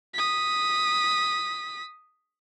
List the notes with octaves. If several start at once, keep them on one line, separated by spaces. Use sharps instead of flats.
D#6 B6